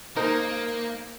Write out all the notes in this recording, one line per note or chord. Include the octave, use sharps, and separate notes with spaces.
A#3 D#4 A#4 C5